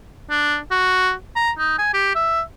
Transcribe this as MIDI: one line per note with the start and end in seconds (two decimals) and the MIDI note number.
0.30 0.58 62
0.71 1.13 66
1.36 1.51 82
1.58 1.75 63
1.79 1.93 80
1.94 2.13 67
2.15 2.41 76